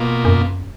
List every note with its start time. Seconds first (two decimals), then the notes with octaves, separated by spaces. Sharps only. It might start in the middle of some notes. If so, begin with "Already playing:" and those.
Already playing: B2 A#3 F4
0.25 F#2